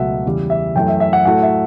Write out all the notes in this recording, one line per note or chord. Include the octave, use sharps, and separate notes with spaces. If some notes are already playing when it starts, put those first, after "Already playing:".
Already playing: C#2 B2 F#3 A3 E5 F#5
E2 C#3 E3 G3
E5
F#2 E3 A3 G5
E5
E5
F#5
A2 F#3 A3 F#5
E5